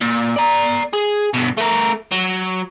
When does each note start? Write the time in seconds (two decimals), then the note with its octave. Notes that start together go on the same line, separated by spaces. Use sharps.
0.01 A#2
0.36 D5 A#5
0.94 G#4
1.34 G2 B2
1.58 A3 A#4
2.12 F#3